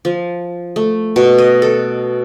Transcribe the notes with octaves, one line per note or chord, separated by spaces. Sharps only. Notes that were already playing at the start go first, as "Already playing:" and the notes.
F3
A3
B2
D#5
A4